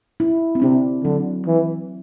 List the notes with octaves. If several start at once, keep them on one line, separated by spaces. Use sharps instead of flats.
E4
C4
C3 D4
D3 F#3
E3